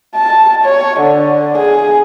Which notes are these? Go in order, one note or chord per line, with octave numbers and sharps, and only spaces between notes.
A5
C#5
D3
G#4